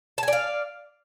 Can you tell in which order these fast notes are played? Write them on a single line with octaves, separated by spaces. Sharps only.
A5 G#5 D5 F5